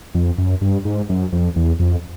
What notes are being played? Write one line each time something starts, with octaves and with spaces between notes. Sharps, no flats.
F2
F#2
G2
G#2
F#2
F2
E2
F2